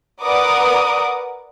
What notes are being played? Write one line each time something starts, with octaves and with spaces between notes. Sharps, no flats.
A#4 B4 D5 F#5 D6 D#6